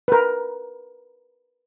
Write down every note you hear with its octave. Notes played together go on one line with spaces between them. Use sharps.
A#4 B4